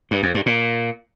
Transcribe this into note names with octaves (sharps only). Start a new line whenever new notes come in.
G2
F2
G2
A#2